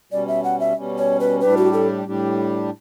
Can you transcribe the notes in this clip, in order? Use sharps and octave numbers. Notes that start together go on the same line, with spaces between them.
B2 G3 C#4 D5
E5
F#5
E5
B2 G3 C#4
C#5
B4
A2 G3 D4 G4 B4
F#4
A4
A2 G3 D4 G4